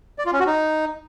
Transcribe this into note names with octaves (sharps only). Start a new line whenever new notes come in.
D5
F4
C#4
F#4
D#4